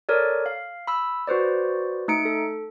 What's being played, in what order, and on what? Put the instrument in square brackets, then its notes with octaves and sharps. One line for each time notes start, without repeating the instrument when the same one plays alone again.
[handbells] A4 A#4 C#5 D5
F5
B5 E6
F#4 B4 C5 D5
A3 D#4 C#7 D7
A4